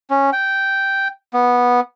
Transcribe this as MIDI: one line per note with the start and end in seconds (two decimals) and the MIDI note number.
0.10 0.30 61
0.33 1.08 79
1.33 1.80 59